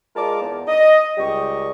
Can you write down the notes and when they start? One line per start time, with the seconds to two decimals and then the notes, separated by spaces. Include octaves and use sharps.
0.14 G#3 F4 A#4 A5 D6
0.41 E2
0.67 D#5
1.17 C#2 G3 G4 D#5 C#6